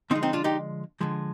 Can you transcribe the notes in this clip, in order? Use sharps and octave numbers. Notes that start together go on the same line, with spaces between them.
D3 F3 G#3 C4 D#4
C4 D#4
D4 F4
D#4 G4
D3 F3 G#3